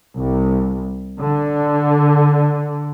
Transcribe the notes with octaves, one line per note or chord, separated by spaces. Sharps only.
C2
D3